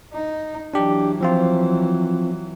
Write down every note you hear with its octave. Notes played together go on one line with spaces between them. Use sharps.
D#4
E3 F#3 D4 G4
F3 C4 F4